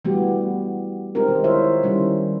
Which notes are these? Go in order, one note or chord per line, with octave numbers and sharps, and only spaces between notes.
E3 G3 A3 B3 F#4 G4
G#3 C4 D#4 F4 G4 A#4
D#3 G#3
E4 F4 C5 C#5 E5
D#3 G3 C#4 E4